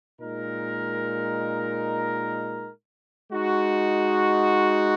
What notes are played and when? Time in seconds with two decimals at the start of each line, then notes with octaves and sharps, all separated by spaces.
0.20 A#2 G#3 D#4 A#4
3.31 G#3 D#4 F#4